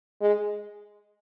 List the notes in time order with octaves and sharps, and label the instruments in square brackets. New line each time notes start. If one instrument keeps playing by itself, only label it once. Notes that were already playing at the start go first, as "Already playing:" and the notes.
[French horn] G#3